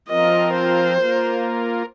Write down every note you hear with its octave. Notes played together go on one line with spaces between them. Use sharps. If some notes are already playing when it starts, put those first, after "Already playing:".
F3 C4 F4 A#4 D#5
C5
A#3 F4 A#4